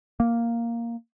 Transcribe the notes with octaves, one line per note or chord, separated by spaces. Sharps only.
A#3